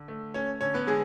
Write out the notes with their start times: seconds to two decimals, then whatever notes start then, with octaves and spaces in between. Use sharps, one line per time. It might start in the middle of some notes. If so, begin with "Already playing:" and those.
Already playing: D3
0.08 A3
0.34 A3 C#4 C#5
0.61 D3 C#4 C#5
0.74 B3 B4
0.87 D3 G#3 G#4